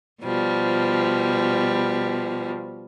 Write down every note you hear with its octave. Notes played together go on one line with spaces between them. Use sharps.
B2 F3 G3